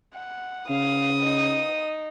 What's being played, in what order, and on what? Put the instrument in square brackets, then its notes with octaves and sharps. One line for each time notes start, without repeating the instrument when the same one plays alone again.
[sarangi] F#5
[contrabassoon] C#3 [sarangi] F5 [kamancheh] D#6
[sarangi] D#4